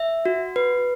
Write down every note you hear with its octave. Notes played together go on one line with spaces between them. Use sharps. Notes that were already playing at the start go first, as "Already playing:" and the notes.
Already playing: E5
F#4
B4